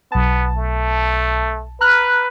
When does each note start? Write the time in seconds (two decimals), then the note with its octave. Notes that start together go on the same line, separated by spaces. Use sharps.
0.12 B1 B3 A5
0.57 A3
1.81 B4 A#5 F6 F#6